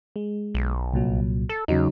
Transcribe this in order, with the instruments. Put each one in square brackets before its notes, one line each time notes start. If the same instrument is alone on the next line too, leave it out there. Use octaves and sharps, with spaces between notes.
[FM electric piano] G#3
[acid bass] B1
[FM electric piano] C2 A#2 F#3
[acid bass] A4
[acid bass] E2 [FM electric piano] C#3 F#3 D#4